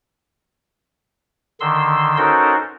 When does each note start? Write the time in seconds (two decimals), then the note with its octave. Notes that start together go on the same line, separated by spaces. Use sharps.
1.60 D3 D#3 C6 E6
2.18 C#4 D#4 F#4 A4 A#4 C5